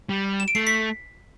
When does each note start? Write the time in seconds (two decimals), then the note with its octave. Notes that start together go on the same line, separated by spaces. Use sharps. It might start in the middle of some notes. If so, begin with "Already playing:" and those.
0.09 G3
0.40 E7
0.48 D7
0.55 A3 C7
0.67 B6